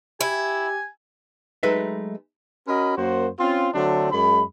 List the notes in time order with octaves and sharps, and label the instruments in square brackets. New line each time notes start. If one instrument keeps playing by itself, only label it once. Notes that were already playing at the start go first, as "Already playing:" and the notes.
[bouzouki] E4 [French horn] G4 [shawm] G#5
[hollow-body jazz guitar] F#3 G#3 A3 D#4 B4 E5
[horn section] C#4 F#4 A#4 D#5 B5
F#2 A#3 F#4 C5
C4 C#4 F4
D3 F#3 A3 C4 D4
F#2 G#3 B5